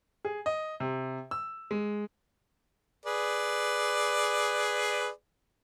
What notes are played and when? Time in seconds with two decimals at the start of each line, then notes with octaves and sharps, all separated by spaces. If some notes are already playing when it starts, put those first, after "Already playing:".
0.25 G#4
0.46 D#5
0.80 C3
1.31 E6
1.71 G#3
3.06 G#4 B4 D5